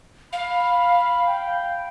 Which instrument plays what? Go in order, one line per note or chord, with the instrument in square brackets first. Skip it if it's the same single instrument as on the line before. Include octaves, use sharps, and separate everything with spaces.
[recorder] F5 [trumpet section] B5
[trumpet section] G5